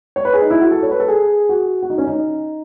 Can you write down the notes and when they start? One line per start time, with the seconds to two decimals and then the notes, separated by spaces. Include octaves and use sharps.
0.16 C#5
0.25 B4
0.34 G#4
0.42 D#4
0.50 E4
0.61 F#4
0.71 A4
0.83 C#5
0.91 B4
1.00 A4
1.08 G#4
1.49 F#4
1.83 F#4
1.90 D#4
1.98 C#4
2.07 D#4